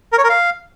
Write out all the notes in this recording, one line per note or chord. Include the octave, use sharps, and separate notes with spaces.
A#4
C#5
A#4
F5